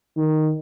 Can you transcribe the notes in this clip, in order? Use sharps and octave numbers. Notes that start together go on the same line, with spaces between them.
D#3